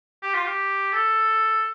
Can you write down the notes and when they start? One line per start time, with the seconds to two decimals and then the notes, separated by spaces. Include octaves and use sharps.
0.22 G4
0.34 F4
0.45 G4
0.93 A4